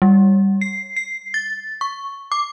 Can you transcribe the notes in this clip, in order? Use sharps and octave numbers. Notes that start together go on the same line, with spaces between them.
G3
C7
C7
A6
C#6
D6